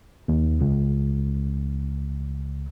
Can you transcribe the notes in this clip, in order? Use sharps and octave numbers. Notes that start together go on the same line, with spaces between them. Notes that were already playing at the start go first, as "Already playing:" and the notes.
D#2
C#2